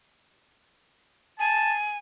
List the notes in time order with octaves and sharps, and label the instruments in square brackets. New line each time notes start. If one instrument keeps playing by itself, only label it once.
[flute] G#5 [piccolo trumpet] A5